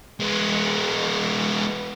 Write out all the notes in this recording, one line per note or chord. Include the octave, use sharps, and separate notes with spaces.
G#3 B3